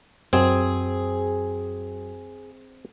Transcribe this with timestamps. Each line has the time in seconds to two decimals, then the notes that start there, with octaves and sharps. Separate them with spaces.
0.33 F#2 C4 G#4